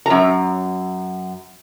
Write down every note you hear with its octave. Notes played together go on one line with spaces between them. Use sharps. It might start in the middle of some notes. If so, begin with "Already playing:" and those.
F#2 A#5